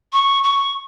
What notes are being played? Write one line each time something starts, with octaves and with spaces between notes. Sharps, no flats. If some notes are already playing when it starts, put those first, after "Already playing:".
C#6
C#6